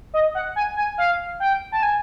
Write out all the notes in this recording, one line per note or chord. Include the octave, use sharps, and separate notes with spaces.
D#5
F#5
G#5
G#5
F5
G5
A5
G#5